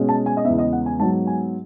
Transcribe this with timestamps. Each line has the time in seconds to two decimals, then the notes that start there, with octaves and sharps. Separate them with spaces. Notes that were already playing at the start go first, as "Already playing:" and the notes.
Already playing: B2 G#3 C#4
0.09 A5
0.26 G#5
0.37 D#5
0.45 E2 C#3 G#3 B3 E5
0.58 D#5
0.72 F#5
0.86 G#5
0.99 G#2 F#3 B3 A5
1.27 G#5